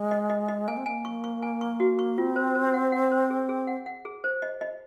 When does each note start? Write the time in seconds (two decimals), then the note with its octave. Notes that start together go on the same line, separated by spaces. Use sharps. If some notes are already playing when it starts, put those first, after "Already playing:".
Already playing: G#3
0.11 D#5
0.30 D#5
0.48 D#5
0.68 A#3 G#5
0.77 C4
0.86 A#3 G#5
1.05 C#6
1.24 C#6
1.42 G#5
1.61 C#6
1.80 F#4
1.99 C#6
2.18 C4 F4
2.36 C5
2.55 C5
2.74 F#5
2.92 F#5
3.12 C5
3.30 G#4
3.49 G#4
3.67 F#5
3.86 F#5
4.05 G#4
4.24 C5
4.42 D#5
4.61 D#5